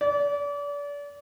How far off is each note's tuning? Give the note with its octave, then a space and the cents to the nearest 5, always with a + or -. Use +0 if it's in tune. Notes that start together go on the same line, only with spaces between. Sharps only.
D5 -35